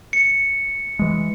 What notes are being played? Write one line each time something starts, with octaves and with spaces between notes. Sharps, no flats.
C#7
E3 G#3